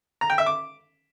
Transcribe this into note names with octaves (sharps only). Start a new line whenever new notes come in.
A#5
G5
E5
D6